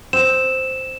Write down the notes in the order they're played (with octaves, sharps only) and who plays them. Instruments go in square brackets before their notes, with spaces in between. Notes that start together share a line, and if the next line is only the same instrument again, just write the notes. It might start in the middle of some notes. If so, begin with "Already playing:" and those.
[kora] C4 [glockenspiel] E7